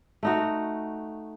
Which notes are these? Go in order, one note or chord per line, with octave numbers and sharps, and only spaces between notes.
A3 D#4 F#4